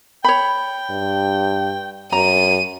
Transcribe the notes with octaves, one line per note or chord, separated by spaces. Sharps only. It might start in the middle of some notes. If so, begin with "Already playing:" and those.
C#5 G5 B5
G2
F#2 A#5 D#7